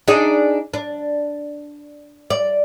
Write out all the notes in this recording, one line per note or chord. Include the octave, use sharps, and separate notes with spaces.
D4 D#4 G#4
D4
D5